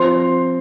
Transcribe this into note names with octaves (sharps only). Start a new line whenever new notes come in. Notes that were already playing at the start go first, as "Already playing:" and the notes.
Already playing: F3 C4 C6